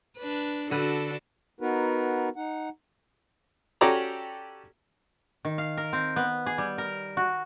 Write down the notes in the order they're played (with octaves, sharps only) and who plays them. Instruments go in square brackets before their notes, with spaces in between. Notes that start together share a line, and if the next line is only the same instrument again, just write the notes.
[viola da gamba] D4 B4
[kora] D3 B4 [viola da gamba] D4 F#4 A4
[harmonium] B3 D#4 F#4 A#4 B4
D#4 F#5
[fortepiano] C#4 F#4 G4 A4 D5 A#5
[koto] D#3
F5
A#4
C4
B3
G#4
G3
A#4
F#4